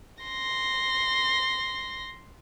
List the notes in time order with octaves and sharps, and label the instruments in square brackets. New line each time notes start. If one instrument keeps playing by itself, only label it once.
[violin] C6 A#6